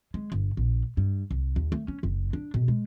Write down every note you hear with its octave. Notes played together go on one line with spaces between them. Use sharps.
G#3
G1
A#1
G2
C2
D#2
A3
C#4
F#1
D4
B2
G#3